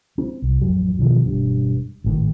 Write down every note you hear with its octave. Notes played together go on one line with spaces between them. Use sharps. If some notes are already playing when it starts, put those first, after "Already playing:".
C4
C2
A1 F2 F#3
B2 D#3 F3
E1 G2
G#1 A2 D#3